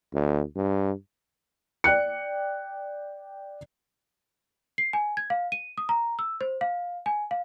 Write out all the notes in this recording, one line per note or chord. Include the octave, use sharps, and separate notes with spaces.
D2
G2
D5 G5 F#6 C#7
C7
G#5
G#6
F5
D#7
D#6
A#5
E6
C5
F5
G#5
F5